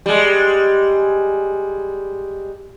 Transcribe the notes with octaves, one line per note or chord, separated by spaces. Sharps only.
G3 G#3